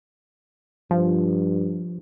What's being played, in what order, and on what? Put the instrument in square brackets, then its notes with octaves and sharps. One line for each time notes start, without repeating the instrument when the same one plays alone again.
[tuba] G2 [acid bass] F3